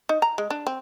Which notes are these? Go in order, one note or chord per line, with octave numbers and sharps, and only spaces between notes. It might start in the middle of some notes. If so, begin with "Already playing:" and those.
D#4
A#5
G#3
D4
C4